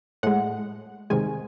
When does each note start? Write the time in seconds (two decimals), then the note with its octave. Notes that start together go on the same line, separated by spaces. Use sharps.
0.23 A2 G#3 F#5
1.10 C3 D#3 G#3 G#5